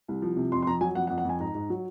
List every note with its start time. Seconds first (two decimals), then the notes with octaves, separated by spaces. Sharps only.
0.08 C2
0.22 F3
0.37 C3
0.52 F2 C6
0.62 C6
0.67 F2 A#5
0.81 F#3 G#5
0.95 F2 F#5
1.07 F#5
1.10 F2
1.18 F#5
1.25 F2 G#5
1.40 G#2 A#5
1.55 G#2
1.70 F#3